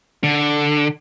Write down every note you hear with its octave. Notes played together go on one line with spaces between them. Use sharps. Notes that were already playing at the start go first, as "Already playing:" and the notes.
D3